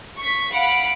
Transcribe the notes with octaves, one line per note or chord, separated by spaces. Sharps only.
C#6 B6
F5 F#5 B5 D7